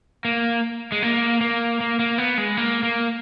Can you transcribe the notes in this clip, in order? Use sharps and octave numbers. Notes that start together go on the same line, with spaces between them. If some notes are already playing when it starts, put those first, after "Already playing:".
A#3
G#3
A#3
A#3
A#3
A#3
B3
G#3
A#3
A#3